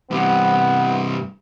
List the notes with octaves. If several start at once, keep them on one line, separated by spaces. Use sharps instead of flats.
G2 C3 B3